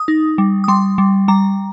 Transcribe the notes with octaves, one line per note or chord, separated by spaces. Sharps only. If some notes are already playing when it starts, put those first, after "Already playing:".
Already playing: D#6
D#4
G3
D#6
G3 C6
G3
G3 A#5